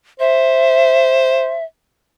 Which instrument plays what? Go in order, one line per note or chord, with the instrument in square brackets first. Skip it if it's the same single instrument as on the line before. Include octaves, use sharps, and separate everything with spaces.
[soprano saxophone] C5 [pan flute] E5